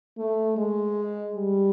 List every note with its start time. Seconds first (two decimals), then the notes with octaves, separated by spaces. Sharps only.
0.18 A3
0.57 G#3
1.36 G3